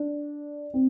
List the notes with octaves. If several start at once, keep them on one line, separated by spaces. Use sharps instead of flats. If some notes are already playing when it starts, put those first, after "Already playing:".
Already playing: D4
C4